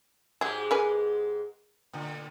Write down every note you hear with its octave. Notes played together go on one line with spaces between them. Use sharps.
G#2 F#3 G#3 G4 G#4
A#4 B4 G#5
A2 D3